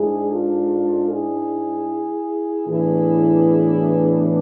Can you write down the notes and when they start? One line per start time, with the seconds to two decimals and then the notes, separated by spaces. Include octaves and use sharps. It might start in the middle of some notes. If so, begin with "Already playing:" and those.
Already playing: G#2 G#3 D4 E4 G#4
0.30 F4 A4
1.10 E4 G#4
2.67 A2 E3 B3 D4 E4 G#4